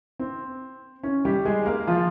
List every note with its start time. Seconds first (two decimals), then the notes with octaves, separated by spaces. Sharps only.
0.19 C4
1.03 C#4
1.25 G3 G4
1.45 G#3 G#4
1.66 A#3 A#4
1.87 F3 F4